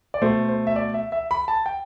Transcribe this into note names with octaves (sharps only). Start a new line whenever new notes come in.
D5
B2 A3 C5
C5
E5
D5
E5
E5
B5
A5
G5